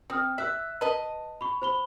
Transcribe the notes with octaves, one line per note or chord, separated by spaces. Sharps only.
C4 G5 D#6 F6
E5 E6 F#6 B6
B4 D#5 A5
B5 C#6
C5 B5 G7